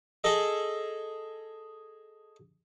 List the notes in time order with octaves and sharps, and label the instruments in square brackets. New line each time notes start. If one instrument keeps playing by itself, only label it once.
[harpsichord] G#4 A4 D#5